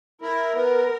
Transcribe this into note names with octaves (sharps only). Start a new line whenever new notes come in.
E4 A#4
B3